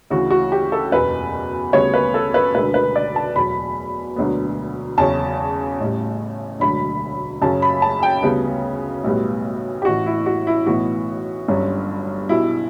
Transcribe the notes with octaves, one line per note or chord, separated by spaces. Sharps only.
D2 C#3 E3 F#4
F#4
G4
A4
F#1 E2 B2 B4
D2 C#3 G3 B3 C#5
B4
A4
B4
E1 D2 D3 B4
B4
D5
A5
E2 B2 F#3 B5
E1 D2 D3 F#3 B3
E2 C#3 F#3 C#4 A5
A1 A2 G3
E1 D2 D3 F#3 B5
F#2 C#3 F#3 C#4 A5
B5
A5
G5
D2 C#3 G3 B3
B1 A2 G3 B3
G4
A1 A2 E3 F#4
E4
F#4
E4
B1 A2 E3 B3 F#4
G1 G2 F#3 C#4
B1 B2 G3 E4